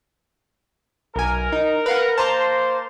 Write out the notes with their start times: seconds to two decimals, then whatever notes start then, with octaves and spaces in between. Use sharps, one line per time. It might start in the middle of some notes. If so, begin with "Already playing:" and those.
1.16 B1 A#4 G#5
1.52 D#4
1.86 B4 F5 F#5
2.18 A#3 C5 A5 A#5 C6